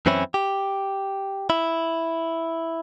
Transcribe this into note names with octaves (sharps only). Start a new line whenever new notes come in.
F#2 E3 C4 C#4 E4
G4
E4